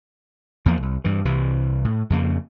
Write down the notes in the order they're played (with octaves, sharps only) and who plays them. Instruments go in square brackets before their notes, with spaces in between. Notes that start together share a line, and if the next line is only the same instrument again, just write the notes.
[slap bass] E2 F3 A#3
C2
G2 E3
C2 C3 E3
A2
F2 C#3 A#3